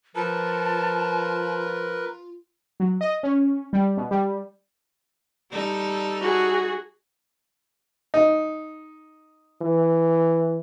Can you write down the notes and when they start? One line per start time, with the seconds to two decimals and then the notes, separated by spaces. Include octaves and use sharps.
0.15 F3 F4 A#4 B4 A5
2.80 F#3
3.01 D#5
3.23 C#4
3.73 G3
3.97 B2
4.11 G3
5.52 G3 D#4 A4
6.21 F#4 G#4
8.14 D#4
9.62 E3